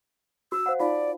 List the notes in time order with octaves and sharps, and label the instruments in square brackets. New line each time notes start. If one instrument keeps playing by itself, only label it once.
[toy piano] F#4 [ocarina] E6
[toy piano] C5 F5 F#5
[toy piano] D#4 F4 F5 [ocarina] D5